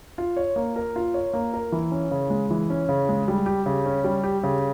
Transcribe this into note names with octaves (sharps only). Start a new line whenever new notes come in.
F4
C#5
A#3
A#4
F4
C#5
A#3
A#4
E3
C#4
C#3
G#3
E3
C#4
C#3
G#3
G3
G4
C#3
C#4
G3
G4
C#3